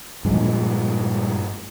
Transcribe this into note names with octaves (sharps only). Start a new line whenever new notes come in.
G2 A#2 F3 G#3